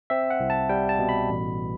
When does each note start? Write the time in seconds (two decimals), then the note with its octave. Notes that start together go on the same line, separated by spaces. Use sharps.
0.10 C4 E5
0.30 F#5
0.40 C2
0.50 A5
0.69 G3 G5
0.89 A5
0.99 B2
1.09 B5
1.29 A1